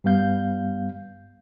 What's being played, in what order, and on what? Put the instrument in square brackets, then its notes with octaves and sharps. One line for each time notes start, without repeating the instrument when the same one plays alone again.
[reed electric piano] G2 G3 B3 F5 G6